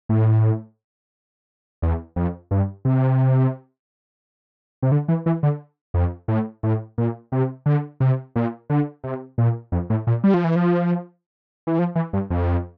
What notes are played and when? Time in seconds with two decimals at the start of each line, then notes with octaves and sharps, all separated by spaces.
0.09 A2
1.82 E2
2.16 F2
2.51 G2
2.85 C3
4.83 C3
4.92 D3
5.08 E3
5.26 E3
5.43 D3
5.94 F2
6.28 A2
6.63 A2
6.98 A#2
7.32 C3
7.66 D3
8.00 C3
8.36 A#2
8.70 D3
9.04 C3
9.38 A#2
9.72 F2
9.90 A2
10.07 A#2
10.24 G3
10.34 F3
10.44 E3
10.56 F3
11.67 E3
11.79 F3
11.95 E3
12.13 G2
12.30 F2